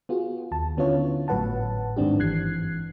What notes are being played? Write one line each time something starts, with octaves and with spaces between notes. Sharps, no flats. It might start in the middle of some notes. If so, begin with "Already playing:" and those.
B3 F4 F#4 G#4
D#2 A5
D3 B3 C#4 E4 F4 C#5
G#1 A2 F#3 B4 F#5 A5
G#2 D#3 C4 D4 G4
G1 F#2 E3 F#6 G#6 C7